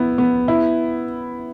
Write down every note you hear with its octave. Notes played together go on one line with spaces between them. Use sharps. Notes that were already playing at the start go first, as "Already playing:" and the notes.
Already playing: B3 E4
B3
E4